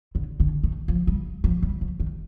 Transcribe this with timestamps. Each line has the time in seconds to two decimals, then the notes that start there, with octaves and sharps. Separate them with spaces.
0.15 D3
0.40 D3
0.64 D#3
0.88 F3
1.07 G3
1.44 F3
1.63 G3
1.81 F3
2.00 D#3